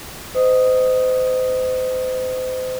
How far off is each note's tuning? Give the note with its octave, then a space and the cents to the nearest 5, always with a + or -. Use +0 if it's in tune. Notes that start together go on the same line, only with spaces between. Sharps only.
C5 -35 D#5 +0 D#6 +0